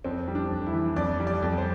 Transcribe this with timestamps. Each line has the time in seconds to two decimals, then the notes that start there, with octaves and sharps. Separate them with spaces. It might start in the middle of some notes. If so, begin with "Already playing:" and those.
0.05 F2 C4
0.28 G3
0.35 D4
0.51 F2
0.66 E4
0.73 E3
0.96 F2 D5
1.20 G3
1.27 D5
1.42 F2
1.58 C5